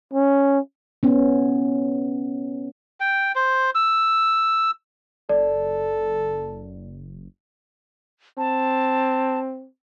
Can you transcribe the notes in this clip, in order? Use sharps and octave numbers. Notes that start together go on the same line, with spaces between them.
C#4
B3 C#4
G5
C5
E6
F#1 A4 D5
C4 A5